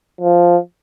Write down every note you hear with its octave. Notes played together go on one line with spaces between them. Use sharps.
F3